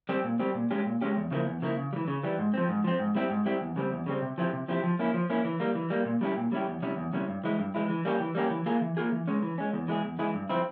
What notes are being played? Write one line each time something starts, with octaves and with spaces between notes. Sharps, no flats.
G3 C4 G4
A#2
G3 C4 G4
A#2
G#3 C#4 G4
A#2
G#3 C#4 G4
E2
C#3 F3 A#3 E4
E2
C#3 F3 A#3 E4
C#3
G3
E3
C#3
E3 G3
G#2
F3 C4
G#2
F3 C4
G#2
G3 C4 E4 G4
G#2
G3 C4 E4 G4
E2
C#3 G3 C4
E2
C#3 G3 C4
C3
F3 C4 E4 G4
C3
F3 C4 E4 G4
F3
A#3 C#4 E4
F3
A#3 C#4 E4
E3
G3 A#3
E3
G3 A#3
A#2
G3 C#4 E4 G4
A#2
G3 C#4 E4 G4
E2
C3 G3 C#4 E4
E2
C3 G3 C#4 E4
G2
E3 G#3 E4
G2
E3 G#3 E4
E3
G3 A#3 C#4 G4
E3
G3 A#3 C#4 G4
E3
A#3 F4 G#4
E3
A#3 F4 G#4
E3
G#3 C#4
E3
G#3 C#4
E2
E3 G#3 E4 G#4
E2
E3 G#3 E4 G#4
G2
F3 C4 E4